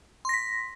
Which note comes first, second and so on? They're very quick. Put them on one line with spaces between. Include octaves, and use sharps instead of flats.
C6 A#6 B6